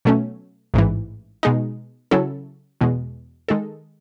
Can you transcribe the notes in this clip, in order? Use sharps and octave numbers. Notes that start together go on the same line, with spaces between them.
B2 F#3 A3 C#4
A1 G#2 E3
B2 G#3 D#4
C#3 F#3 C#4 E4 A4
E2 B2 G#3
D#3 G#3 D#4 A4